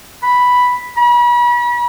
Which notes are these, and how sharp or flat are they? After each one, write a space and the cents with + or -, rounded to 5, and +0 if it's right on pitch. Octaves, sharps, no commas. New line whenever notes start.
B5 +0
B5 -40